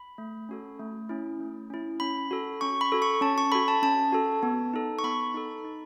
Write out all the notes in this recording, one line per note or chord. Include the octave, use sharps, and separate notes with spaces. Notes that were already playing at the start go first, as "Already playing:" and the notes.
Already playing: B5
A3
C#4 F#4 A4
A3
C#4 E4
A3
C#4 E4
C#4 B5
F#4 A4
C#4 C#6
B5
F#4 A4
C#6
C#4 A5
C#6
F#4 A4 B5
A5
C#4 A5
F#4 A4
B3
D#4 A4
C#6
B3 B5
D#4 A4
D#4